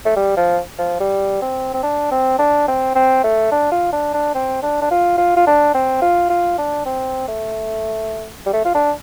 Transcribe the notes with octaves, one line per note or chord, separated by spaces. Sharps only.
A3
G3
F3
F3
G3
C4
C4
D4
C4
D4
C4
C4
A3
D4
F4
D4
D4
C4
D4
D4
F4
F4
F4
D4
C4
F4
F4
D4
C4
A3
G3
A3
F4
D4